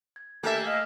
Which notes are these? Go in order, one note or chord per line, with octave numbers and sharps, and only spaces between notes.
G#6
A3 A#3 G4 A4 E5 G#5 G#6
D#5 F5